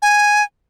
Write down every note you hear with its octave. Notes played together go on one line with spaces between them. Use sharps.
G#5